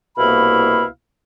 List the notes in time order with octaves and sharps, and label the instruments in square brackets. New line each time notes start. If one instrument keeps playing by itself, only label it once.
[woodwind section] C2 B2 A#3 E4 F5 B5